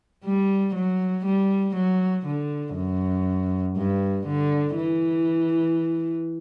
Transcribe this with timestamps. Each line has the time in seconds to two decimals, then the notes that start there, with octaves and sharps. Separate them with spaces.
0.25 G3
0.75 F#3
1.25 G3
1.75 F#3
2.25 D3
2.75 F#2
3.76 G2
4.26 D3
4.76 E3